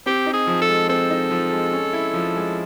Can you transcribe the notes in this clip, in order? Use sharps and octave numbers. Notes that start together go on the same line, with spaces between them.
C4 G4
D#4
G#4
F3
A4
G#3
C4 A4
D#4
F3
G#3
C#4
E4
F3
G#3